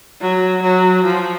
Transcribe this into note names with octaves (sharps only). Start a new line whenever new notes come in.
F#3
F#3
F3